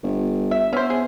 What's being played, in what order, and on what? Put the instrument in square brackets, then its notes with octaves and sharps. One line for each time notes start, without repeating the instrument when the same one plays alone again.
[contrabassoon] G1
[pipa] E5
[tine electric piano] B3 E5 [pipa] C#4 C5
[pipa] G#4